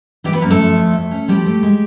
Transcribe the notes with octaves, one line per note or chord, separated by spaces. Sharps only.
E3 G3 G4
B3 B4
F#2 A#3 A#4
A3 A4
F3
F2
A3
C#4
F3 G3 G4
A3
G#3